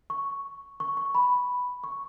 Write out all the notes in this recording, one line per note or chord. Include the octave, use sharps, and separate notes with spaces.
C#6
C#6
C#6
B5
C#6